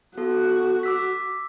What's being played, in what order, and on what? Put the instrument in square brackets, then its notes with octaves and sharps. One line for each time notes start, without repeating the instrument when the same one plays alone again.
[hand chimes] B3 A4 [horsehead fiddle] F#4
[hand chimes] D6 E6 B6